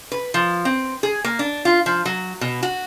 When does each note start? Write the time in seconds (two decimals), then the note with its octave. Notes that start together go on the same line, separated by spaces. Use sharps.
0.12 B4
0.34 F3
0.65 C4
1.03 G#4
1.24 A#3
1.39 D4
1.65 F4
1.86 F3
2.05 F#3
2.41 B2
2.63 F#4